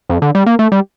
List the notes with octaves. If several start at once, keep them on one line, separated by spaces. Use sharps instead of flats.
F2
D3
G3
A#3
A3
G3